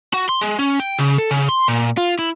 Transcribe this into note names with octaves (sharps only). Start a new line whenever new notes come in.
F#4
C6
G#3
C#4
G5
C#3
A4
C#3
C6
A#2
F4
E4